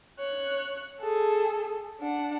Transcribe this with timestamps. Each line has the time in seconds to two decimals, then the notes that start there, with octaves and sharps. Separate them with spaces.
0.19 C#5 F#6
1.00 G#4 A4
2.01 D4 F#5